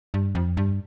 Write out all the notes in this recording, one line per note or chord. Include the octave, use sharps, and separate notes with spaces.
G2
F2
G2